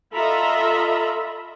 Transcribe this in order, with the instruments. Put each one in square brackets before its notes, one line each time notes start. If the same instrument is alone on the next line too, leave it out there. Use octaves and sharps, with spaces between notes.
[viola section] F4 A4 D#5 E5 A#5 B5